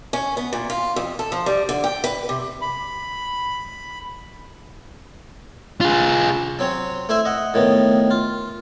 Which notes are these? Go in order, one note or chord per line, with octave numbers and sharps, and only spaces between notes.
C#4
B3
A#2
F4
F2
A4
F3
G3
D3
G5
B4
C3
B5
F4 G#4
F#3 C4 C#5
A3 E4 C5 E5
D#5 F#5
A2 D#3 B3
F4